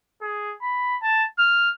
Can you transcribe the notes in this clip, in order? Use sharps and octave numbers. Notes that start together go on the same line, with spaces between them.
G#4
B5
A5
F6